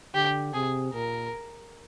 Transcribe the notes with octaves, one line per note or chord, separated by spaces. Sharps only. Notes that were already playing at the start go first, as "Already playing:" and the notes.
D3 G4
C3 G#4
A#2 A#4